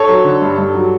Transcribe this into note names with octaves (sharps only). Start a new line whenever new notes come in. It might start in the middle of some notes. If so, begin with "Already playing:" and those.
Already playing: A4 C#5
F#3
D3
G2
G2
F#3